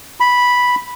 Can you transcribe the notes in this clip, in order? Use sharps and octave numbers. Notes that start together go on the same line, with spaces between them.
B5